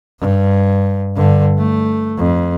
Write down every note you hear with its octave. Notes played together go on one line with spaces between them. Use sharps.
G2
G2 D3
A3
F2